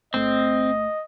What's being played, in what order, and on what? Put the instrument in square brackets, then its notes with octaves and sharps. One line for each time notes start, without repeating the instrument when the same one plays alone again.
[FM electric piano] G1 A3 [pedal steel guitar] C4 [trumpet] D#5